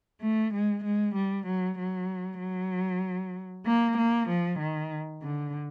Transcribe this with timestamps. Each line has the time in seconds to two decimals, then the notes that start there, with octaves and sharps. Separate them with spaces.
0.21 A3
0.53 G#3
0.84 G#3
1.15 G3
1.47 F#3
1.79 F#3
2.40 F#3
3.66 A#3
3.98 A#3
4.29 F3
4.59 D#3
5.22 D3